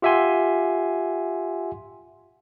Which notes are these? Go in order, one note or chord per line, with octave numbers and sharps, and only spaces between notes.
F4 G4 E5 F#5 G#5 C6